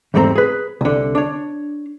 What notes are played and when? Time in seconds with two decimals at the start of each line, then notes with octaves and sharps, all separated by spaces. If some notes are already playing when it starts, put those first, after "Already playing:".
0.14 E2 G#2 G3 A3 C4 A#5
0.36 G#4 B4
0.81 C2 D3
1.15 D4 C#5